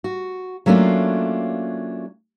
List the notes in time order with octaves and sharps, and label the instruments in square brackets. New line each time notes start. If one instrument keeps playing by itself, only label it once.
[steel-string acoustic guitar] F#4
F#3 A3 A#3 C#4 D4 F4